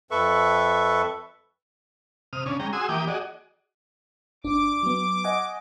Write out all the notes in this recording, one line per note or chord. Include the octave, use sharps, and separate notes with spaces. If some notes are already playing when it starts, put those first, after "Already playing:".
F2 A4 B4 E5 C#6
C3 D#6 F6
C#3 C#4 D4
G#3 C#4 G5 A#5
F#4 G#4 G#5 C6 D#6 E6
E3 A#3 G4 G5 D6 D#6
F#4 G#4 D5 D#5
G1 D4 D6
F#3 B3
D#5 F#5 G#5